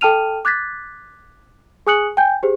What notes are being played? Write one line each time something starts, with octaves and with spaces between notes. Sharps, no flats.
A4 G5 A5 F6 D#7 F7
D6 F#6 G#6 A6 B6
G#4 G#5 D#6 F#6 C#7 F#7
G5 G#5 G6
G4 G#4 C5